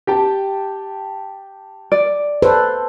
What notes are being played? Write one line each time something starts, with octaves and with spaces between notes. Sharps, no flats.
G4 G5 A5
D5
A4 B4 C5